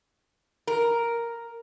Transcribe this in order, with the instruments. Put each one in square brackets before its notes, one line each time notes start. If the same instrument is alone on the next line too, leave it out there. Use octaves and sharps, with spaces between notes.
[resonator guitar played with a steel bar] A#4